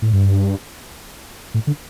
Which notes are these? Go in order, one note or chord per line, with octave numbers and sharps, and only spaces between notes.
A2
G2
A2
D3